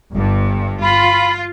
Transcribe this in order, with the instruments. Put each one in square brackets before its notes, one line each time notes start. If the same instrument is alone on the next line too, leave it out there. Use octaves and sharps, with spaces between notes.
[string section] G1 G2
[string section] F4 [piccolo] B5